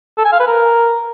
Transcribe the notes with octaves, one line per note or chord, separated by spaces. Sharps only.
A4
G#5
F5
B4
A#4